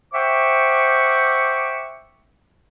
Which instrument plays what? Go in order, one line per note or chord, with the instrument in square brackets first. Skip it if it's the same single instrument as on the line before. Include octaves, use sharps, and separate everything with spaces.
[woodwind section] C5 E5 F#5 G5 C#6 D6